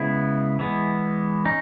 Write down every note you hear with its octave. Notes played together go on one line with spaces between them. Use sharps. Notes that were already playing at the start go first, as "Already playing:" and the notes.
Already playing: C#3 G#3 B3 E4
E3 G#3 B3
C#4 D#4